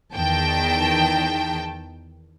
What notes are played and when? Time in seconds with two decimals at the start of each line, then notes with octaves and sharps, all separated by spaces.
0.15 E2 D#3 G5 A5